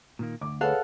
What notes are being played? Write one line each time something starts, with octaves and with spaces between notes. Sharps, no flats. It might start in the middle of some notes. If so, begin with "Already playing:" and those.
A#2 D#3 A#3
D2 D6
G#4 A4 B4 C#5 F5 F#5